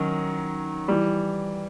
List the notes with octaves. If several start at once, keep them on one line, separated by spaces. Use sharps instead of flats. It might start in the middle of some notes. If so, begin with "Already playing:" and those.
Already playing: D#3 F#3 C#4
E3 G3